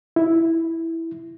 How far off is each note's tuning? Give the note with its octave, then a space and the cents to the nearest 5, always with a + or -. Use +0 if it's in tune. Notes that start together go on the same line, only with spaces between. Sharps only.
E4 -5